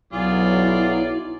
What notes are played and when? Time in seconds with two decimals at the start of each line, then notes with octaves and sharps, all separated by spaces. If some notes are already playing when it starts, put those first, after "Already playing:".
0.13 B1 F#3 E4 F4 G#4 D5